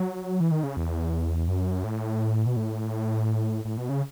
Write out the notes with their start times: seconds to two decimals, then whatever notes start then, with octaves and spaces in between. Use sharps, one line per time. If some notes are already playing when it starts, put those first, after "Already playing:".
Already playing: F#3
0.40 E3
0.51 D#3
0.63 C#3
0.77 E2
1.48 F#2
1.84 A2
2.46 B2
2.56 A2
3.65 A2
3.78 B2
3.89 C#3